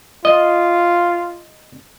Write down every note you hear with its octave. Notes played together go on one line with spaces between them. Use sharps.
F4 D#5